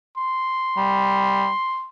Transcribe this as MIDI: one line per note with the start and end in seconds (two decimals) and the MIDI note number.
0.18 1.88 84
0.77 1.50 55